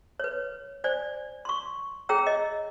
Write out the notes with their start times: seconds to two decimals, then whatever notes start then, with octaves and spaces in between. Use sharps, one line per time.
0.20 B4 C#5
0.84 C5 D5 G#5
1.45 C6 C#6
2.09 G#4 C#5 G5 A#5 E6
2.27 D#5